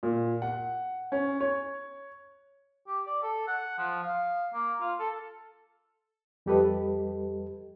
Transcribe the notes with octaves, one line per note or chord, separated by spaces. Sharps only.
A#2
F#5
C#4
C#5
G4
D5
A4
F#5
F3
F5
A#3
F4
A4
F2 G3 G4 A4 B4 D#5